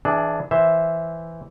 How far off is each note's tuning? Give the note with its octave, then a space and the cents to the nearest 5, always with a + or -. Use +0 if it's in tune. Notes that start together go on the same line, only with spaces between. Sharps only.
E3 -5 D4 +0 G#4 +25
E3 +0 C5 +0 E5 +0